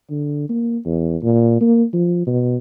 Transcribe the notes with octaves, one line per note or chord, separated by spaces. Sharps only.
D3
A#3
E2
A#2
A#3
F3
B2